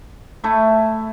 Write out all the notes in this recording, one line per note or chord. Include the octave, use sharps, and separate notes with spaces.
A3 E4